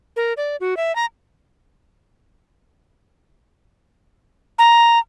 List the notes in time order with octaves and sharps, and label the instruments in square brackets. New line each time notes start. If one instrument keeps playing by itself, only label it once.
[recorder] A#4
D5
F#4
E5
A#5
A#5